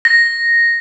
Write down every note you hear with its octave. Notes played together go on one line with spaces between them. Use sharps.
A#6